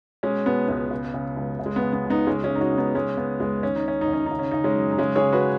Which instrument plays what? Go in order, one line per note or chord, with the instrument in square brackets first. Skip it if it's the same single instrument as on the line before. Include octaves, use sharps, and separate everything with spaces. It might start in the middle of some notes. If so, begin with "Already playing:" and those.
[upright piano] B2 G#3 C#4
B2 B3
C#2 B3
C#3
C#3
C#2
C#3
G#3
B3
C#3
B3
C#2
B3 D#4
C#3 G#3 C#4
G#3 C#4
C#3
D#4
C#4 F#4
C#2
B3 D#4
C#3 G#3 C#4
C#3 B3
C#2 G#3
D#3 C#4
D#4
D#3 C#4
D#4
D#2
C#4
C#3 D#4
C#4
C#3 D#4
G#3 C#4
F#2
D#4
C#3 G#3 C#4
G#4 C#5
C#3
F#4 B4